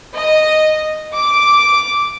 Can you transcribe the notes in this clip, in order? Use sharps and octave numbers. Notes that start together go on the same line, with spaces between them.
D#5
D6